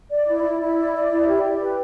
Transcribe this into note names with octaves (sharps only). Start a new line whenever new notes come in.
D5
E4
E4
E4
D5
D5
E4
G4
G4
B4